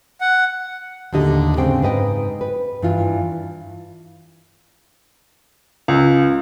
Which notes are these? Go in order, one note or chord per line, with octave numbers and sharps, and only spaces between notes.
F#5
D#2 A2 D3 G4 D#5
G#2 C#3 G#3 C4 G5
G#2 B4 D#5 G5
B4
G2 E3 F4
C#2